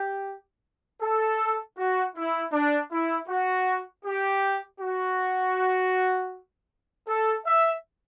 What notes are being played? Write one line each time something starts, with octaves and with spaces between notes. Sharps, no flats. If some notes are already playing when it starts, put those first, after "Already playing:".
Already playing: G4
A4
F#4
E4
D4
E4
F#4
G4
F#4
A4
E5